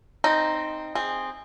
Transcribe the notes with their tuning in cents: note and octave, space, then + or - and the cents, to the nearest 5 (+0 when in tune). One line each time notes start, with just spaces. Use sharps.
C4 +0 D#4 +0
C4 +0 G#4 -15